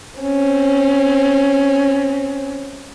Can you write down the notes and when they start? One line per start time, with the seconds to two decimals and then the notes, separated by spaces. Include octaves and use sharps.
0.20 C4 C#4